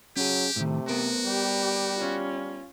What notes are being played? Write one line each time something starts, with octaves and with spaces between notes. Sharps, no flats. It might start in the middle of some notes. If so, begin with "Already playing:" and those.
F#3 C#4 G4 G#4
A2 C3 D#3 A3
B3 F#4 A#4 C5
G3 G4
C#4 F4